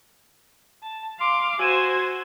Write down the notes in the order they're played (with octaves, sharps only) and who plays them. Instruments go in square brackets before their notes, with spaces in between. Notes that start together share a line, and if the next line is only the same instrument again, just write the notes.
[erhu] A5
[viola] F5 [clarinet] C6 [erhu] D6
[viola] F#4 C5 [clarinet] G#5 [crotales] E6 D#7 E7 [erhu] G#6